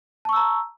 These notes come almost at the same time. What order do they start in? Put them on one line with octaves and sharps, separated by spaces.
A5 C#6 E6 A#5